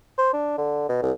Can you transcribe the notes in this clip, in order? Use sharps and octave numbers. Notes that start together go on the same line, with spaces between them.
C5
D4
D3
B2
C2